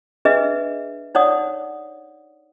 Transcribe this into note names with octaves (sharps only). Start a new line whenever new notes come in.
D4 G#4 B4 D#5 E5
D#4 C#5 D5 F#5 D#6